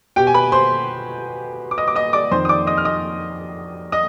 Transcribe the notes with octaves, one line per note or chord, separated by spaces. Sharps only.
B2 G4 G5
G#5
B4 B5
C5 C6
D6
D#5 D#6
D6
D#5 D#6
D5 D6
F2 D#3 C5 C6
D#6
D5 D6
D#5 D#6
F6
D#5 D#6
D#5 D#6